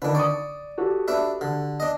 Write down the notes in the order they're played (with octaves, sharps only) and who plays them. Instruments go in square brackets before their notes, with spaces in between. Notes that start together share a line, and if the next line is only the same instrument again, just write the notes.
[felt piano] D3 D#3 [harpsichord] D4 B4
[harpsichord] D5 [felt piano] C#6 D#6
[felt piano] F#4 G4 A4
[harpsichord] D4 B4 E5
D3
D4 D#5